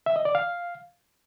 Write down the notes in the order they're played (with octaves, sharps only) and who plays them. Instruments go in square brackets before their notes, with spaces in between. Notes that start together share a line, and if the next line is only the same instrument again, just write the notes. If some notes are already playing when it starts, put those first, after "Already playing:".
[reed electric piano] E5
D#5
D5
F5